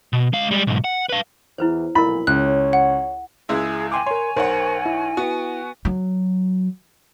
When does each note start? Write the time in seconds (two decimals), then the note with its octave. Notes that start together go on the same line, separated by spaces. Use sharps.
0.13 B2
0.33 G#3 F5
0.51 G3 G#3
0.67 B1 G#2
0.84 F#5
1.09 B4 F5
1.58 E2 E4 B4 C5
1.95 B1 F2 A#2 E4 A#4 B5
2.27 C#2 C#5 F#6
2.73 F#5
3.49 C#2 G#3 E4 G#4
3.92 G5 G#5 C6 D6
4.06 A#4 C#5 C6
4.36 B1 A#4 C5 C#5 F#5
4.86 E4
5.17 B3 F#4
5.85 F#3